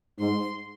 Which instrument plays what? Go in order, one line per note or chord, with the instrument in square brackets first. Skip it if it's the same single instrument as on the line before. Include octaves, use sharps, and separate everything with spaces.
[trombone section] G#2 [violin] C6